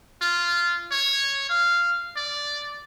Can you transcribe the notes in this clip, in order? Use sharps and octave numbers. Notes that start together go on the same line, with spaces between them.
F4
C#5
F5
D5